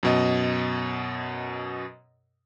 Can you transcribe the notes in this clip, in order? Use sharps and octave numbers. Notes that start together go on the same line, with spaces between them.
F#2 B2 D#5